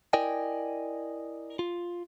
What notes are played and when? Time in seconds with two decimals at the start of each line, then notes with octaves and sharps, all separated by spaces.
0.13 E4 A#4 D5 D#5 G5 G#5
1.59 F4